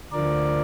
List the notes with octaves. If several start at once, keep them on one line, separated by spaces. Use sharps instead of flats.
D2 D3 F3 A#4 D5